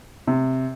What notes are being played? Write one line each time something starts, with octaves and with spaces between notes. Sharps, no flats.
C3